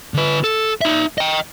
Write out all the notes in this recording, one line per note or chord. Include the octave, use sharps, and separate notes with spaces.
D3 B4
A4
D#4 E5
D#5 G5